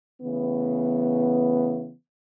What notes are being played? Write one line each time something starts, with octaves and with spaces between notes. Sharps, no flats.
C#3 E3 A3 B3